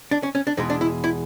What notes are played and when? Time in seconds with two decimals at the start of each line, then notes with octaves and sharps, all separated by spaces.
0.11 D4
0.23 C#4
0.35 C#4
0.47 D4
0.57 E2 B2 G#3 D#4
0.70 D4
0.81 E4
1.04 E4